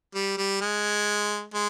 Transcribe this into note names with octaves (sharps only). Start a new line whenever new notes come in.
G3
G3
G#3
G#3